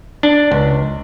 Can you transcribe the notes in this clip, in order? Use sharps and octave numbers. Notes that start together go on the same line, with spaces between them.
D4
C#2